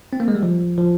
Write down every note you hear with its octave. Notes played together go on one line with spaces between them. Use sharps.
C4
A#3
G#3
G3
F3
F3